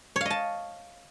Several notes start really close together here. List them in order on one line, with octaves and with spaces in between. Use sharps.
C#5 F5 D#5 A5